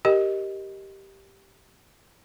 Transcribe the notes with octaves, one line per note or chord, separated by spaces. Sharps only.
G4 A#4 D#5